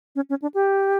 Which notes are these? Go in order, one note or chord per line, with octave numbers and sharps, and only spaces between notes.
C#4
C#4
D4
G4